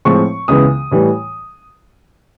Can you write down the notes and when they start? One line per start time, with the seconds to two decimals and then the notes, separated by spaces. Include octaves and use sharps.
0.05 A2 F3 G#3 C4 C#6
0.48 C#2 C#3 E3 G#3 B3 D#6
0.91 A2 E3 G3